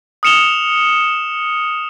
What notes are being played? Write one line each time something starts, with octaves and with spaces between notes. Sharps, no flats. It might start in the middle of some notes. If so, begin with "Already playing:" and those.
D#6 F6 C#7 E7 F7 G7